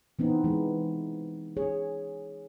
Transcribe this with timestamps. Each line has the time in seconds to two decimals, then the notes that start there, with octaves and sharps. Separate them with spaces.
0.19 E3 B3 C4 D#4
0.44 E3 G#3
1.57 G#4 C#5